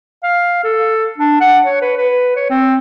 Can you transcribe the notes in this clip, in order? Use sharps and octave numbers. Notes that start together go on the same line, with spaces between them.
F5
A4
D4
F#5
C#5
B4
B4
C#5
C4